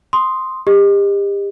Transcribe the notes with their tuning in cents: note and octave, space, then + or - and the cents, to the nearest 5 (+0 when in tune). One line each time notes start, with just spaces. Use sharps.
C6 +0 D#6 +0
G4 +35 D#5 -15